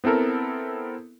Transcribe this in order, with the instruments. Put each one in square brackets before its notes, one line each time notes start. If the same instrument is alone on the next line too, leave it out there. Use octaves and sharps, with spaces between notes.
[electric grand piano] B3 C4 E4 A4 A#4